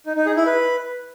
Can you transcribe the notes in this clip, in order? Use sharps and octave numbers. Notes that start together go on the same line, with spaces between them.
D#4
D#4
G#4
E4
B4